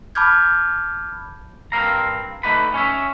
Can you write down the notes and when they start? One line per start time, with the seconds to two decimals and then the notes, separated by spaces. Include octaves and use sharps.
0.15 A5 B5 D6 F6 G6 G#6
1.72 G2 C4 A#4 F5 A#5
2.43 D3 A3 D#4 F#4 B4 B5
2.74 C#4 C#5 E5